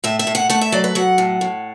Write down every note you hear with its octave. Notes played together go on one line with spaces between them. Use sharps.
A2 E5
E5
A2
F#5
A3 F#5
E5
F#3 D5
B4
F#3 F#5
A2
A2